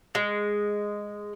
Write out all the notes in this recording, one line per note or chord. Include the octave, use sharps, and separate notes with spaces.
G#3